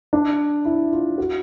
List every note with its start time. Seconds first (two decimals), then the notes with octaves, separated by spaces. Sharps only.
0.13 D4
0.65 E4
0.92 F4
1.18 F#4